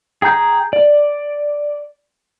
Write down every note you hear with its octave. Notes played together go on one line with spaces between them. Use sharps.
G#4 G5 A#5 G6
D5